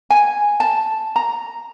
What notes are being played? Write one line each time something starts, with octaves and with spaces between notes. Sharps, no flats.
G#5
A5
A#5